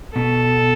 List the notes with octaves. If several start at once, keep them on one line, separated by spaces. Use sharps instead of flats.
B2 A4